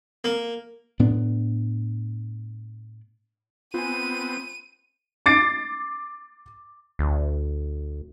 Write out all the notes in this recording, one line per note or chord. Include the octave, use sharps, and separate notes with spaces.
A#3
A2 B3 D4
B3 C4 F4 G#5 D#7
D6 A6 C7 D7
D2